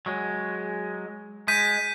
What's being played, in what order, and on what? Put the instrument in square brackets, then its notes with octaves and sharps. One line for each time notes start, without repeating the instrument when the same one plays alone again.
[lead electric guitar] F#3 G#3
[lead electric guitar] G#3 [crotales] G6 B6 D#7